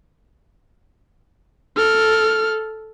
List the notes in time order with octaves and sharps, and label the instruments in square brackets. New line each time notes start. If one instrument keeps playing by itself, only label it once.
[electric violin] A4 F6